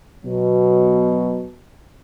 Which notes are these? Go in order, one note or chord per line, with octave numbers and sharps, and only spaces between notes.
B2 F#3